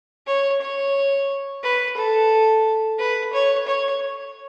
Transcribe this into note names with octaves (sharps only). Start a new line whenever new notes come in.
C#5
C#5
B4
A4
B4
C#5
C#5